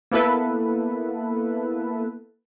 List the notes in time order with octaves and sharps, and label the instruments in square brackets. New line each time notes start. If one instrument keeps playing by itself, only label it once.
[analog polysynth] A#3 B3 E4 A4 B4